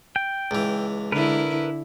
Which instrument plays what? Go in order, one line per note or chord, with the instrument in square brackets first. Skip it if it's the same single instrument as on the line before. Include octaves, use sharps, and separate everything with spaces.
[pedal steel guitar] G5
[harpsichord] C#2 E3
[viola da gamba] D3 E4 [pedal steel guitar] A#4 B4